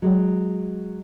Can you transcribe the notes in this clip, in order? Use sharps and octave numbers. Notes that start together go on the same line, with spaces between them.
F#3 G#3